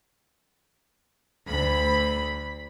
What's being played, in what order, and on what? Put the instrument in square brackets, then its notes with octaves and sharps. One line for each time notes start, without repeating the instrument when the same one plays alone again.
[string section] D2 B5